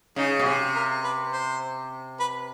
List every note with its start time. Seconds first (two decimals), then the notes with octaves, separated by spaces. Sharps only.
0.16 C#3 D#4
0.39 B2
0.45 C3 G#4
0.75 A#4
1.04 B4
1.32 C5
2.20 B4